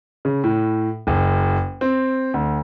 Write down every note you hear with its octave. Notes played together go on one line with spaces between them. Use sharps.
C#3
A2
F#1
C4
D2